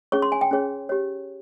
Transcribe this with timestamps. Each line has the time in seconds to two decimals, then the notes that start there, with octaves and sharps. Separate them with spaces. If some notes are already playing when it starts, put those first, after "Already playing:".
0.12 C#4 G#4 C#5 C#6
0.22 C6
0.32 G#5
0.41 G5
0.51 C#4 G#4 C#5
0.89 G4 C#5